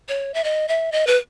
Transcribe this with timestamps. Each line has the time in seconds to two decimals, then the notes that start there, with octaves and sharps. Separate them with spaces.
0.09 C#5
0.34 E5
0.44 D#5
0.68 E5
0.92 D#5
1.07 B4